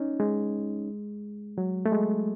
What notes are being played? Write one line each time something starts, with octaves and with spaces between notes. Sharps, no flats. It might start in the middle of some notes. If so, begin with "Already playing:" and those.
Already playing: C#4 D#4
G#3
F#3
A3
G#3